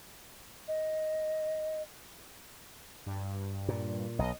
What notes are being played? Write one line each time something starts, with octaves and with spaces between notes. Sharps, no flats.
D#5
G2
A#2
B1 D#5